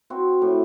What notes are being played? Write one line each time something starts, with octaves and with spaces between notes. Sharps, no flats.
C4 F#4
A2